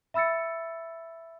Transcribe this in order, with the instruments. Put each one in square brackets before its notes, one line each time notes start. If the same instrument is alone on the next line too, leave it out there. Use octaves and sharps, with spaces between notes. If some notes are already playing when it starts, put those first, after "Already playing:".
[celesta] E5 B5 E6 A6 C#7